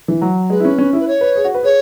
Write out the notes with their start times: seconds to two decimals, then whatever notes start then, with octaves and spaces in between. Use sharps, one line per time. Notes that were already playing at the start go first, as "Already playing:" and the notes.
0.08 E3
0.22 F#3
0.50 G#3 B4
0.60 E4
0.65 C#4
0.78 C#4
0.93 E4
0.99 B4
1.07 C#5
1.21 B4
1.36 G#4
1.45 F#4
1.55 B4
1.63 G#4 C#5